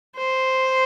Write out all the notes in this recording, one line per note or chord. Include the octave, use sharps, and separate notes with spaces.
C5